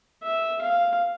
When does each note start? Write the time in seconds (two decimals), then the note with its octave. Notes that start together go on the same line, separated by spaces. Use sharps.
0.23 E5
0.61 F5